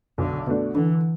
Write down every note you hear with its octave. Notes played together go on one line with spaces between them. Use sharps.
B1 D3
B2 A3 D4
D3 E3